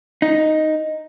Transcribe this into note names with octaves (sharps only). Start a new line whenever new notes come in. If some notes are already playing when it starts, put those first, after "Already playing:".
D#4